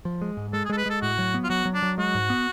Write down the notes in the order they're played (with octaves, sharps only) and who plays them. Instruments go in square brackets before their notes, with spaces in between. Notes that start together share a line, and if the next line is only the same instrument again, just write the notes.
[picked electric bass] F3
G#3
G#2
[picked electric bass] G#3 [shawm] A4
[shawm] G#4
[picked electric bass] G#3 [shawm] A4
[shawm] B4
[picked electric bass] G#3 [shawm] A4
[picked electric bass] A2 [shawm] F#4
[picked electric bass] F#3
B3
[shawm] F4
[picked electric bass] F#3 [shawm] F#4
[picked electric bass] F#3
[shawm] D4
[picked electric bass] F#3
[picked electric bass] G#3 [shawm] F#4
[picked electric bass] G#2
B3